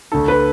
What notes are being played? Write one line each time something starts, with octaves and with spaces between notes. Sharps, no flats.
D2 D3 A4
B4